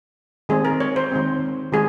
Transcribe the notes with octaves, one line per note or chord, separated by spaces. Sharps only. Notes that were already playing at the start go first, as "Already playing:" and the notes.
D#3 G#3 C4 G#4
A#4
C#5
C5
D#3 G#3 C4
D#3 G#3 G#4